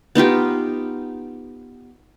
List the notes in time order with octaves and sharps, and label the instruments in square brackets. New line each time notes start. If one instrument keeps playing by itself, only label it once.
[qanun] B3 D#4 F4 G4